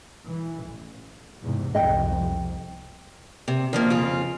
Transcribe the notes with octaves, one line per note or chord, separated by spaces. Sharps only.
E3
A1
E2 G#2 C3
C2 F2 D#5 G5
C3
D#3 F3 A#3
F2 C#3 F4